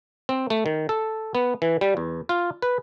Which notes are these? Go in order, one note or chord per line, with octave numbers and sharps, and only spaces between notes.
C4
A3
D#3
A4
B3
E3
G3
E2
F4
B4